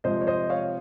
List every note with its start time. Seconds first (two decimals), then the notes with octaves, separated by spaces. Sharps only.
0.04 C3 F3 G#3 C5 D#5
0.21 C#5
0.27 C5 D#5
0.50 C#5 F5